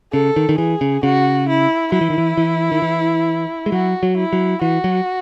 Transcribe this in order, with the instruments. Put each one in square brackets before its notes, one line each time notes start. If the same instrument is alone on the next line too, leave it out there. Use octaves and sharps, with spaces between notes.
[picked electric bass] C#3 [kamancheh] A4
[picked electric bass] D#3
D#3
[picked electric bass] E3 [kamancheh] G#4
[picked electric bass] C#3
[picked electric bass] C#3 [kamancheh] F#4
[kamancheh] E4
[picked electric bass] F#3 [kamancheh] E4
[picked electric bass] E3
D#3
E3
E3
D#3
E3
G#3
[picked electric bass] F#3 [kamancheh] F#4
[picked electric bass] F#3
[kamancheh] E4
[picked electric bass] F#3
[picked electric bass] E3 [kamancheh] F#4
[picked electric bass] F#3